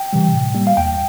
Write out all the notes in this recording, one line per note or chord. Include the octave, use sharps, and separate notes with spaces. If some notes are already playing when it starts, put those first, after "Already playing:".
Already playing: G5
C3 E3 G3
A2
G3 A#3
F5
E2 G5